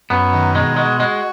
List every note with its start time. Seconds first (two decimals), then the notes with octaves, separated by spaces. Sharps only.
0.10 F#2 B3
0.33 D#3
0.54 B2 G#3
0.76 G#3 F#4
0.99 G#3 F#4